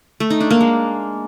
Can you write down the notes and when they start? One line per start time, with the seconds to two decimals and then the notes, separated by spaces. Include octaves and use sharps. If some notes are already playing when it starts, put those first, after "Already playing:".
0.20 A3
0.30 D#4
0.40 D4
0.51 A#3
0.61 G#3